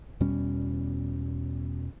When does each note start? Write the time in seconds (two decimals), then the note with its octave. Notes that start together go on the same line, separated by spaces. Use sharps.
0.20 E2 B2 G3 C#4